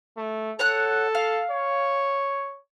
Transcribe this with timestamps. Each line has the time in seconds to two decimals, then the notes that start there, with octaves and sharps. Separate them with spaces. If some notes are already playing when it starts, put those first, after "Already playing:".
0.18 A3
0.59 A4 C#5 F#5 F#6
1.15 F5
1.51 C#5